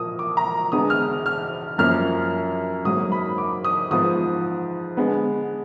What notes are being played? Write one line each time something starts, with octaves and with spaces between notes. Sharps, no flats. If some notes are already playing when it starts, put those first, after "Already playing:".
Already playing: A#2 F3 A#3 D#6
D6
A#5
D3 G#3 B3 D#6
F6
F6
F#2 F3 A#3 F6
G#2 F#3 A#3 D#6
B5
D6
D#6
G#2 F3 B3 D#6
D3 G#3 B3